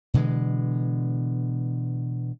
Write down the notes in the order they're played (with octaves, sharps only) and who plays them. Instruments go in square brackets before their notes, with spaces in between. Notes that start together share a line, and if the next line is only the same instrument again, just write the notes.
[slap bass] B2 D3 E3 G#3